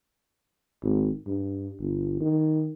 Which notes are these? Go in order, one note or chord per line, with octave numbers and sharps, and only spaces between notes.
G#1
G2
G1
D#3